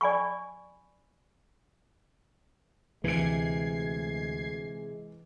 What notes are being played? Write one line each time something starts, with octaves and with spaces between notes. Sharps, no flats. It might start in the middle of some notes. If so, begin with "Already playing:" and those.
D5 G#5 B5 C#6
D2 C3 E3 G#3 G#6 C7 D7